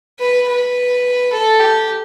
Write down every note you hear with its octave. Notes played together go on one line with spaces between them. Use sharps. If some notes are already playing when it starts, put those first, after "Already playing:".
B4
B4
A4
G4